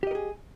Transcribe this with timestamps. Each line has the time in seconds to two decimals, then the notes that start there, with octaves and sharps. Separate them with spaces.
0.03 G4
0.07 D#5
0.11 A#4
0.15 G#4